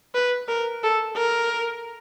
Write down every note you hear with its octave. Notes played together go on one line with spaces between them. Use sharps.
B4
A#4
A4
A#4